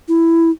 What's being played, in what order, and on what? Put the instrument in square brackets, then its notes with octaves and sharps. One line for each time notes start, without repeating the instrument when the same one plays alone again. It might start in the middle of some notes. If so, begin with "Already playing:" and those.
[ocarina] E4